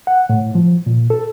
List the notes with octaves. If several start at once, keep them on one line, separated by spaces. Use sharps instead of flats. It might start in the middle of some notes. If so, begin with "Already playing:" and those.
F#5
A2
F3
A#2
A4